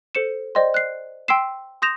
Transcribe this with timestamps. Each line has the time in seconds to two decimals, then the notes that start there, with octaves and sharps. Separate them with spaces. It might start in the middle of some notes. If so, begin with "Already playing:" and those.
0.15 A4 C5 C#7 E7
0.55 C5 D5 D#5 G5 C6
0.74 F#6 C7
1.28 G5 C6 E6 B6 C7 E7
1.82 C6 D#6 G6 A#6 E7 F7